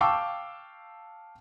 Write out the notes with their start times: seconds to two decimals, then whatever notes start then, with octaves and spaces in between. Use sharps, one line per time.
0.01 F5 G5 A5 C#6 D6 E6